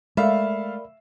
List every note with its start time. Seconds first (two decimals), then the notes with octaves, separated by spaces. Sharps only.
0.17 G#3 A3 A#4 D5 E5 F5 B5